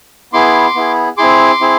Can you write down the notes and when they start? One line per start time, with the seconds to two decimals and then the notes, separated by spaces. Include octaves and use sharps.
0.33 B3 E4 G#4 C6 D6
0.75 B3 E4 G#4
1.17 C4 E4 G#4 C6 D6
1.60 C4 E4 G#4